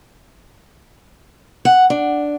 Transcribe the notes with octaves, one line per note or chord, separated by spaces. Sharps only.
F#5
D4